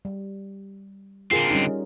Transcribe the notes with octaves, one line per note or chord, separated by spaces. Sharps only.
G3
D3 C4 F4 G#4 A#4
G3 C#4 D#4